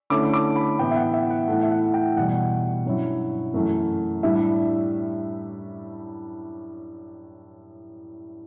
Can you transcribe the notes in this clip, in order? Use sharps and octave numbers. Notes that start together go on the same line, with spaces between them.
D3 A3 C#4 E4 D6
D6
B5
A2 E3 B3 E4 G5
E5
F#5
E5
F#5
A2 E3 A3
E5
F#5
G5
E2 B2 G3 F#5
G2 F#3 C#4 E4
F#2 E3 A3
A2 G3 D4 E5